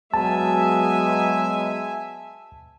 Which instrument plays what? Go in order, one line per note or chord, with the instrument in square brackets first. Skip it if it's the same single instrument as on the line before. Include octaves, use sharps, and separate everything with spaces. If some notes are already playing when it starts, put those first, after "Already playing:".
[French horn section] F#3 G#3 B3 [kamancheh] E5 G#5 [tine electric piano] A5